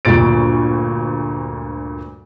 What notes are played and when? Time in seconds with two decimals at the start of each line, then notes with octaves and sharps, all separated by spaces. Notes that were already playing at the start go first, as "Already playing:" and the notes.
0.05 D2 G2 A#2 A6 D7